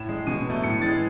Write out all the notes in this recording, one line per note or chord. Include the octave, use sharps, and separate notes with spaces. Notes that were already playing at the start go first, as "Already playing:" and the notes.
Already playing: A2 E7
G#3
B2 D#7
F#3 A3
A2 C#7
E3 G#3 A6